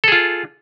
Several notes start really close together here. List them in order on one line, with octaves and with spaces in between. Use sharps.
A4 G#4 F4